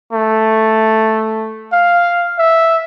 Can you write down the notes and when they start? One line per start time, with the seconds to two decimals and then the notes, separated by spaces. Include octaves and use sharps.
0.13 A3
1.72 F5
2.39 E5